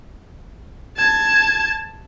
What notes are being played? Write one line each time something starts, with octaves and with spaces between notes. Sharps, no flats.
A5 G#6